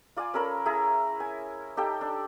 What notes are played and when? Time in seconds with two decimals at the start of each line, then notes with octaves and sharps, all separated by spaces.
0.17 F4 D5 F5 G#5
0.34 C#4 A4 A#4 B5
0.66 E4 G#4 A#5
1.20 G#5
1.77 D#4 G4 A4 G5
2.01 D4